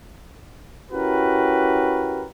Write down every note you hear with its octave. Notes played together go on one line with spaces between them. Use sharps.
C#4 E4 F#4 G4 A#4 B4